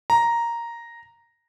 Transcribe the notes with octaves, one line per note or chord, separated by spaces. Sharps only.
A#5